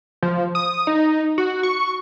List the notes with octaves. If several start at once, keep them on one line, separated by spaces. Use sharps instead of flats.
F3
D#6
D#4
F#4
C#6